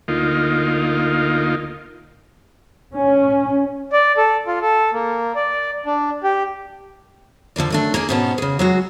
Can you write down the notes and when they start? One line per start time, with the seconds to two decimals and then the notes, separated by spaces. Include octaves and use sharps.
0.08 D2 A#3 D#4 F4
2.93 C#4
3.92 D5
4.17 A4
4.47 F4
4.62 A4
4.92 A#3
5.35 D5
5.86 D4
6.23 G4
7.56 D3 F3 A#3 D5
7.70 F#2 A3 D4
7.94 A#3 G#4 D5
8.09 G#2 B2 B3 C#4 A5
8.38 C#3 G#4
8.59 F#3 G#3 F#4